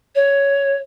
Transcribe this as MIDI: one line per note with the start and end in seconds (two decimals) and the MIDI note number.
0.15 0.77 73